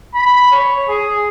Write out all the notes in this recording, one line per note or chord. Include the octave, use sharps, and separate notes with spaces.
B5
C#5
G#4